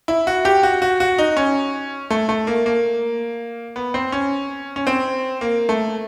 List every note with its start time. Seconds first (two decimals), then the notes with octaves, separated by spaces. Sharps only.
0.08 E4
0.27 F#4
0.45 G4
0.63 F#4
0.82 F#4
1.00 F#4
1.18 D#4
1.37 C#4
2.10 A3
2.29 A3
2.47 A#3
2.66 A#3
3.76 B3
3.94 C4
4.12 C#4
4.76 C#4
4.87 C4
5.41 A#3
5.69 A3